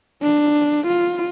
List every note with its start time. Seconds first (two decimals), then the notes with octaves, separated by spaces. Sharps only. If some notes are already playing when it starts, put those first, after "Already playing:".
0.22 D4
0.87 F4